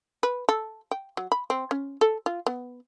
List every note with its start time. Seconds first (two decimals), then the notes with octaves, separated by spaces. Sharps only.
0.23 B4
0.49 A4
0.91 G5
1.17 F#3
1.32 B5
1.50 C4
1.71 C#4
2.01 A4
2.26 F4
2.46 B3